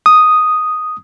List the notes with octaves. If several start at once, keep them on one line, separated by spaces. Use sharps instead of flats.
D#6